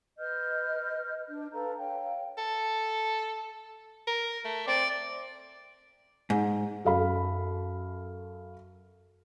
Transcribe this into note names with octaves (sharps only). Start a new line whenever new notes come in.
B4 D#5 F6 G6
D4
A4 B4 F5 A#5
C#5 F5 G5
A4
A#4
A3
C4 D5
G#2
F#2 A4 F5 B5